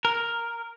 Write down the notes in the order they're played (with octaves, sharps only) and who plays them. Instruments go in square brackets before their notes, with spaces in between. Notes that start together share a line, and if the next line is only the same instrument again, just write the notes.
[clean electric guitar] A#4